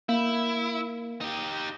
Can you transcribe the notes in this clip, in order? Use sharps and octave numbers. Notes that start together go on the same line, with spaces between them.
A#3 E4
D#4 G4